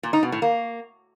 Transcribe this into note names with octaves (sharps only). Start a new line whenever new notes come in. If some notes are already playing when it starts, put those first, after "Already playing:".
A#2
D#4
B2
A2
A#3